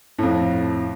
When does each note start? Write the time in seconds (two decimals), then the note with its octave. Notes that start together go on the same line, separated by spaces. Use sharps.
0.18 F2 A2